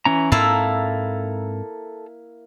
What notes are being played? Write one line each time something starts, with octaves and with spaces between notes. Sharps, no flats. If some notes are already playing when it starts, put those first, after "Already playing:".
E3 C#4 A#5
G#2 A#3 C4 E4 A4 A5 A#5